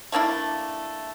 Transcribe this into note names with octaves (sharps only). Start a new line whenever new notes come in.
A3 A#3 D4 E4